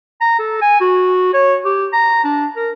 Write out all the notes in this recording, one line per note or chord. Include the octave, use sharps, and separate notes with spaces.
A#5
A4
G#5
F#4
C#5
G4
A#5
D4
A#4